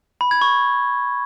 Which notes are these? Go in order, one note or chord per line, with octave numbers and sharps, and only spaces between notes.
B5
G#6
C#6